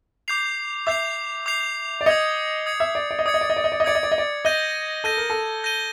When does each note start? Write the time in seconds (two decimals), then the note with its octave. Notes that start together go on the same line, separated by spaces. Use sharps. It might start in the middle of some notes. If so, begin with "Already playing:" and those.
0.28 D6 G6 C7 F7
0.87 E5 D6 G6 C7 F7
1.46 D6 G6 C7 F7
2.01 D5
2.06 D#5 D#6 G#6 C#7
2.66 D#6 G#6 C#7
2.80 E5
2.95 D5
3.11 D5
3.19 D#5
3.26 D5 D#6 G#6 C#7
3.34 D#5
3.41 D5
3.50 D#5
3.57 D5
3.64 D#5
3.72 D5
3.80 D#5
3.84 D5 D#6 G#6 C#7
3.95 D#5
4.03 D5
4.11 D#5
4.18 D5
4.45 D#5 G6 A#6 D#7 G7
5.04 A4 G6 A#6 D#7 G7
5.17 A#4
5.30 A4
5.64 G6 A#6 D#7 G7